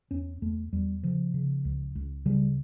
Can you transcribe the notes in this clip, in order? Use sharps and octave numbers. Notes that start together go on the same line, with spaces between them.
E2 C#4
E2 A3
E2 G3
C#3 F3
C#3
C#2
C#2
C#3 G3